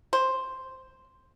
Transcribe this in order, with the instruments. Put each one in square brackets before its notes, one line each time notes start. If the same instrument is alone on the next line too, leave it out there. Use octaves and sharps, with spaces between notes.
[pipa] C5